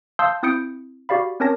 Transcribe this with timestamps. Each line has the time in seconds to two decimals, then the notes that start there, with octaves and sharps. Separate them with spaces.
0.19 F5 A5 C6 D#6 E6 G6
0.43 C4 E4 D#6 G6 C#7 D7
1.09 F#4 G4 D5 F5 B5
1.40 C4 C#4 A#4 C#5 A5 A#6